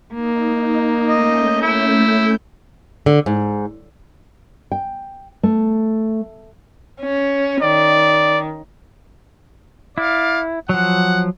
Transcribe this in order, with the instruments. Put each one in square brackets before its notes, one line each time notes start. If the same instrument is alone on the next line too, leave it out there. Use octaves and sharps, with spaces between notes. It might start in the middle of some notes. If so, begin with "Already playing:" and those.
[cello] A#3 [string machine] D#4
[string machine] A3 C#4 G6 [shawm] D#5
[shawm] E4
[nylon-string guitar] D3
G#2
G5
A3
[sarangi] C#4
[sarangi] D#3 [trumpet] D5
[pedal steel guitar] E4 [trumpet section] D5 F5
[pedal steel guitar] F3 F#3 [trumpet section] F#5